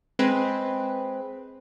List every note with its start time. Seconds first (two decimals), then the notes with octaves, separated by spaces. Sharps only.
0.19 G#3 C4 B4